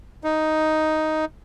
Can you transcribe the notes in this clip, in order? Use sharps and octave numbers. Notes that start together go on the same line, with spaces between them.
D#4